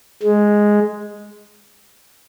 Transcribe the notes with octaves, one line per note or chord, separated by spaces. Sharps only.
G#3